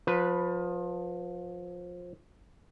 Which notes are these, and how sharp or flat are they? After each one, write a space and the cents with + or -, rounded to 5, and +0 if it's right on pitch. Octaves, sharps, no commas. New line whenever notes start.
F3 +25 B4 +0